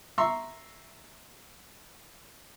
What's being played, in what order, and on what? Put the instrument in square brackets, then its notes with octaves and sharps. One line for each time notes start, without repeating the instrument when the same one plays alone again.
[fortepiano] E5 A#5 C6 C#6 E6